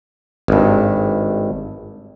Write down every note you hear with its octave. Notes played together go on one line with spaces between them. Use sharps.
G#1 G2